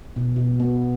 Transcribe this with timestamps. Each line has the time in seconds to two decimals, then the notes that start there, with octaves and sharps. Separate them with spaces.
0.16 B2
0.36 B2
0.60 B3